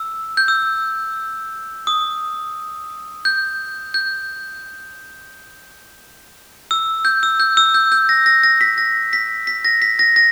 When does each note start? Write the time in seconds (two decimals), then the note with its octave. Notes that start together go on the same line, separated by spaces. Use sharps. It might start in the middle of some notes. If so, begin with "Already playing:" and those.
Already playing: E6
0.37 G6
0.48 E6
1.87 D#6
3.25 G6
3.94 G6
6.71 E6
7.05 G6
7.23 E6
7.40 G6
7.57 E6
7.74 G6
7.92 G6
8.09 A#6
8.26 A#6
8.43 A#6
8.61 B6
8.78 A#6
9.13 B6
9.47 B6
9.65 A#6
9.82 B6
9.99 A#6
10.16 A#6